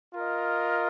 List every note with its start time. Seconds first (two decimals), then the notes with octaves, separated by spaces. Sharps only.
0.13 F4 A#4 D#5